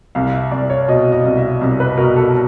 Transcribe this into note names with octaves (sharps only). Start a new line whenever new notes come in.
C2 F5
E5
C2 D5
C#5
B2 D#5
D#5
C2
E5
C2
B4
B2 A#4
A4